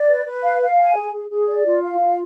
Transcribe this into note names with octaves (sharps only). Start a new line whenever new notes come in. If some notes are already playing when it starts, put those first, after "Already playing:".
Already playing: D5
B4
B4
F5
F5
G#5
G#4
G#4
G#4
D5
F4
F5
F4